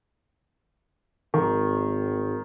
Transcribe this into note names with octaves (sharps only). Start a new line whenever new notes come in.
G#1 D#3